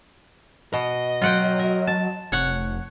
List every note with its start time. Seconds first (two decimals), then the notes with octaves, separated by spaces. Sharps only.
0.73 B2 D#5
1.22 F#3 F4 F#5 G5
1.59 A#4
1.87 A5
2.32 F1 C#5 F#5